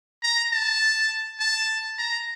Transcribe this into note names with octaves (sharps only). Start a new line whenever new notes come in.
A#5
A5
A5
A#5